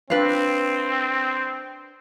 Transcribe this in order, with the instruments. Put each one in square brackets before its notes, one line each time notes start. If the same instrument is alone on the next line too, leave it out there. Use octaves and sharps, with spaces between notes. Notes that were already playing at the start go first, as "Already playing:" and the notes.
[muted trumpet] C4 [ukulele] D4 B4 F5